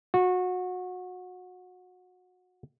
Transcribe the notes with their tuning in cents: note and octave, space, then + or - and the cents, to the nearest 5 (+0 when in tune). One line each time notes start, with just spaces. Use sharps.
F#4 -25